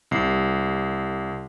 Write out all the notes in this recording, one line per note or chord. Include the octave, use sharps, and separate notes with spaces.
C2 C7